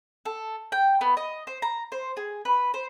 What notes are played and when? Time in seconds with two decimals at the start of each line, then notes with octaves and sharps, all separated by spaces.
0.25 A4
0.72 G5
1.01 B3
1.17 D#5
1.47 C5
1.62 A#5
1.92 C5
2.17 G#4
2.45 B4
2.74 C5